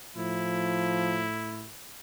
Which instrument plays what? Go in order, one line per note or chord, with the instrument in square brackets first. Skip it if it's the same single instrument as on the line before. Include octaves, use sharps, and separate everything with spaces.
[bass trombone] A2 [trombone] F3 [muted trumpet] E4